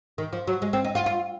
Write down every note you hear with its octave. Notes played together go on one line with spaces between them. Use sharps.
D#3
F3
F#3
G#3
C4
D#4
F4
F4